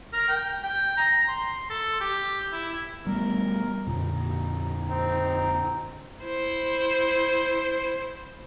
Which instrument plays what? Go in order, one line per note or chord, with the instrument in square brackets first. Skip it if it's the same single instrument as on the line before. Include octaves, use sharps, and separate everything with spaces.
[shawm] A#4
G5
G5
A#5
C6
A4
G4
E4
[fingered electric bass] G3 A3 B3 [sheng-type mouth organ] A#4
[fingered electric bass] F2 A#2 D3 [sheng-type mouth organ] D#4
[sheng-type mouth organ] C4 D#4
[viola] E4 C5